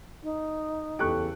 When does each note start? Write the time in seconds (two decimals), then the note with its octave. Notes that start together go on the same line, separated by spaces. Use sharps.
0.23 D#4
0.99 E2 C#3 G4 A4 C#6 F#6 D7